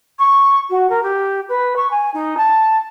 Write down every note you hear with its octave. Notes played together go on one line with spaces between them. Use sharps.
C#6
F#4
A#4
G4
B4
C#6
G#5
D#4
A5